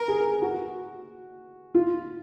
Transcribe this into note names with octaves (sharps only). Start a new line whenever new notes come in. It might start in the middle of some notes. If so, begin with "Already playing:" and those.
Already playing: A#4 B4
G#4
F#4
F4